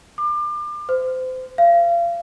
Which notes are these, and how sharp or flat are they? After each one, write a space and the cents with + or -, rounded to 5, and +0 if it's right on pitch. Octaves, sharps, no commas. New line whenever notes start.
D6 +35
C5 -30
F5 -35